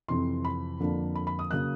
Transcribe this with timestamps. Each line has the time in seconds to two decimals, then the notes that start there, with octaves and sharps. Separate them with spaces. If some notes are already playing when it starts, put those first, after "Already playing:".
0.08 F2 C3 E3 C6
0.45 B5
0.80 F2 D3 F3 A#3 D4
1.15 B5
1.27 B5
1.39 D#6
1.51 C#3 F#3 A#3 F#6